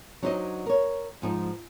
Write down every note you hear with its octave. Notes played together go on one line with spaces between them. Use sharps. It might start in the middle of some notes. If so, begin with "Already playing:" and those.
F#3 D4 D#4 C5 C#5 D#5
A#4 C#5
G#2 F3 D#4